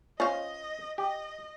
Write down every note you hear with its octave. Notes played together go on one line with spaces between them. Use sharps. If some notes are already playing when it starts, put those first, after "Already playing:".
C#4 F4 C5 D#5 F5
G4 D#5